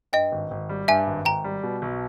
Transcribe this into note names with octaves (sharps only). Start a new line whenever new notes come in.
G2 D#5 G5
G#1
G#1
G3
G2 E5 G#5
G#1
G#1 G5 A#5
G3
B2
B1